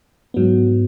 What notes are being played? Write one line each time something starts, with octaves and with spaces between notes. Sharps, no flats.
G#2 F#3 B3